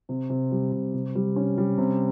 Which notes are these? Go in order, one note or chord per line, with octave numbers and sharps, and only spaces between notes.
C3
C3
G3
C3
C3
G3
C#4
G3
C3